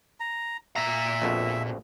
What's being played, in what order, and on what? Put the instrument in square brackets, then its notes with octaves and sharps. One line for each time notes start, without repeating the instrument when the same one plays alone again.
[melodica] A#5
[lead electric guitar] A#2 A#5 [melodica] E5
[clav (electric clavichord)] A#1 F2 B2